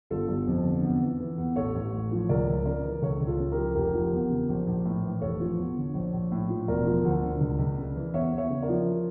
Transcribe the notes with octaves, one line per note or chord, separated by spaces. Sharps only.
G1 F4 A4
G1
F2
D3
E2
E3
E3
E2
A1 A4 C#5
A1
A2
F3
C#2 A#4 D5
C#2
C#3 A#4 D5
E3
C#2 A4 C#5
C#2
F4 A4
C#3
G4 A#4
F3
F1 G4 A#4
F3
E2
C#3
A#1
A#1
A2
E3
F1 A4 C#5
F3
E2
D3
A#1
A#1
A2
F3
E1 A#4 D5
F3
D2
D3
C#2
C#2
C#3
E3
E2 C#5 E5
E2
C#5 E5
C#3
A#4 D5
F3